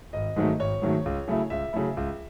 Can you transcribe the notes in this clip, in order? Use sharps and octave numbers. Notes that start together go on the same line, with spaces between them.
G#1 D#5
G#2 D#3 F#3 A3
G#1 C#5
G#2 D#3 F#3 A3
C#2
C#3 F#3 A3 E4
C#2 E5
C#3 F#3 A3 E4
C#2